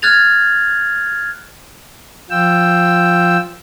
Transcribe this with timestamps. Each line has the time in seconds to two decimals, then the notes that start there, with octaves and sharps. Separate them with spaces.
0.02 F6 F#6 G#6 A6 F7
2.31 F3 F4 G5 E6